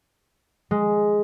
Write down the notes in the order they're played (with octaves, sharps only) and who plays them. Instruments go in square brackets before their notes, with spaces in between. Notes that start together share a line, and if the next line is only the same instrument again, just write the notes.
[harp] G#3